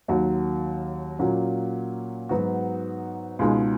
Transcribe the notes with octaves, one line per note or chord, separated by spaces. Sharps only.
D#2 D#3 F#3
A#2 F#3 A#3 C#4
G#2 F#3 B3 D#4 F#4
C#2 B2 G#3 D#4